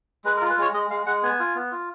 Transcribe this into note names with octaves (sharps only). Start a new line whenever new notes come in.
G#3 B4
A#4
F4
B4
G#3 C#5
G#3 D#5
G#3 F5
G#3 F#5
B3 G#5
F4
B3
F4